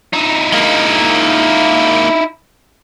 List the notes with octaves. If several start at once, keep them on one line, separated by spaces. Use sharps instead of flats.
D#4 E4
G#3 A#3